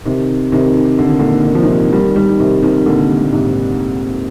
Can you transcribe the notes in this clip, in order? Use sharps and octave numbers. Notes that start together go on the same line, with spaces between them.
C3 D#3
C3 D#3
D3
D#3
A#2 D3
D#3
F3
C3 D#3
D#3 G3
D#3 G3
C3 D#3
C3 D#3
A#2 D3
A#2
G#2 C3